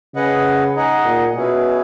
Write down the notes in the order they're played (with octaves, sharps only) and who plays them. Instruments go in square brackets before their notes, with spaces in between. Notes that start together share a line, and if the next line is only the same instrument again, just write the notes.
[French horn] C#3 [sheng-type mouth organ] G#4 B4 D#5 F#5
[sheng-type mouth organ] D#4 G#4 D#5 F#5
[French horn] A#2
[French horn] B2 [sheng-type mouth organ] C#4 E4 G#4 B4